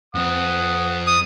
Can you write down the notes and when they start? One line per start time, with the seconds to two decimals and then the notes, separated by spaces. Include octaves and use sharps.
0.15 F2 C4 F#5 D#6
1.07 D#6